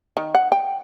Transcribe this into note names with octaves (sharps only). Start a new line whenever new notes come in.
D#3
F#5
G5